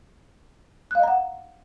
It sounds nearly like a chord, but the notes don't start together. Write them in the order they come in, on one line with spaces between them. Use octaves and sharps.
F#6 F5 D#5 A#5 F#5